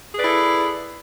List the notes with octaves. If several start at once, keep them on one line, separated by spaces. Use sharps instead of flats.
E4 G#4 A4 B4 D5